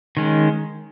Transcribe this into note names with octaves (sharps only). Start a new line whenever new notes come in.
D#3 G#3 C#4